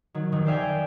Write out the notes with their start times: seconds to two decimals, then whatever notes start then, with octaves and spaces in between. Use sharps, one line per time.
0.14 D#3 F#3
0.32 F1 D#3
0.46 C5 D5 E5 F5 G5 G#5
0.64 F5